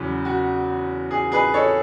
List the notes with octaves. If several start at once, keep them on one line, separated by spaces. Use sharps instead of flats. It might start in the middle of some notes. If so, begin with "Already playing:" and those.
Already playing: E2 C#3 F#3
F#4
G#4
G#4 B4
A4 C#5